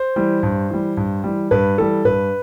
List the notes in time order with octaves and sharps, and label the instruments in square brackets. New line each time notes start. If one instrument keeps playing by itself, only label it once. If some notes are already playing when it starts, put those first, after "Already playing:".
Already playing: [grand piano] C5
E3 G3
G2
E3 G3
G2
E3 G3
G2 B4
E3 G3 A4
G2 B4